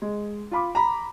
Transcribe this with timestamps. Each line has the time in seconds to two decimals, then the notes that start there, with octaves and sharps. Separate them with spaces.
0.02 G#3
0.51 F4 B5 D6
0.75 A#5 B5